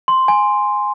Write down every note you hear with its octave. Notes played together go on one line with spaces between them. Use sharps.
C6
G#5